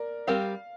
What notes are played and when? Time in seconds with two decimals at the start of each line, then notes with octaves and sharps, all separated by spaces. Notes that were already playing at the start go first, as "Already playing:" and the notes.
Already playing: A#4 D5
0.27 G3 C4 G4 A#4 F5